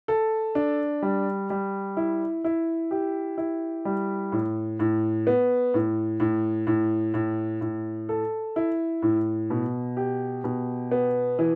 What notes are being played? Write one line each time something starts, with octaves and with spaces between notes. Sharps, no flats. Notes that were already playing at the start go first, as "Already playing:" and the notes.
A4
D4
G3
G3
E4
E4
G4
E4
G3
A2
A2
B3
A2
A2
A2
A2
A2
A4
E4
A2
B2
G4
B2
B3
E3